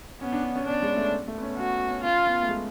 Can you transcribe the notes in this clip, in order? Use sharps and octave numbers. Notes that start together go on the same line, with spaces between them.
B3 C#4
D4
D4
C#4
B3 D4
G#3
A3
A3
B3
C#4
C#4 F#4
C#4
C#4 F4
B3
A3
G#3